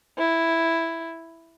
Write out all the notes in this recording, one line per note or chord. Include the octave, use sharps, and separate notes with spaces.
E4